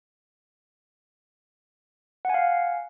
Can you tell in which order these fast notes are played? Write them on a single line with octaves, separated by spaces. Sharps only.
F#5 G#5 F5